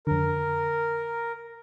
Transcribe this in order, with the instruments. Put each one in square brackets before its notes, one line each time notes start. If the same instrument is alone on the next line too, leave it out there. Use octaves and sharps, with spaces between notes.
[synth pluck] F2 D3 [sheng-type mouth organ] A#4